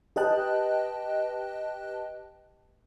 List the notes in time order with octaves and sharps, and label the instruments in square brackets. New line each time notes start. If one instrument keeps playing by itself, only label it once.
[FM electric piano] G4 B4 D#5 G5 A5 F#6